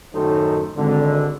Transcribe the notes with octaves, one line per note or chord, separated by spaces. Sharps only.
F#2 A2 D#3 D#4 A4 C5
G#1 D3